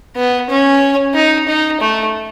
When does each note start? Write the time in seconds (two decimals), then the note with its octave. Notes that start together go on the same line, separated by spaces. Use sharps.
0.16 B3
0.49 C#4
1.14 D#4
1.47 D#4
1.80 A3